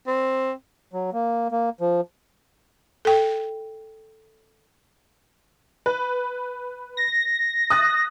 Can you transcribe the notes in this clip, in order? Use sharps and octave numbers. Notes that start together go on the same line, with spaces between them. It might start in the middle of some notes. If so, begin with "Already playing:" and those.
C4
F#3
A#3
A#3
F3
A4 G5
B4
A#6
D#6 F#6 A6